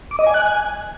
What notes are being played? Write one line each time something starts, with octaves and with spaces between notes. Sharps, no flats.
D6
D#5
G#5
F#6
G#5